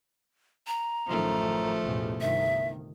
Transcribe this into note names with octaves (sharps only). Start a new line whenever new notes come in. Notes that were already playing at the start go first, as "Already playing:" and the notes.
A#5
A1 F#2 D#3 F3 A3
A1 E2 B2
G1 C2 D#3 E5